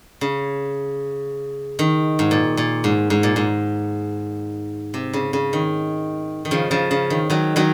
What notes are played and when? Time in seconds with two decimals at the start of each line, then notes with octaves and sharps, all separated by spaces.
0.21 C#3
1.79 D#3
2.19 G#2
2.31 A#2
2.57 A#2
2.84 G#2
3.10 G#2
3.23 A#2
3.36 G#2
4.94 C3
5.13 C#3
5.33 C#3
5.53 D#3
6.45 D#3
6.51 C#3 F3
6.71 C#3 F3
6.91 C#3
7.10 D#3
7.30 D#3 F#3
7.56 D#3 F#3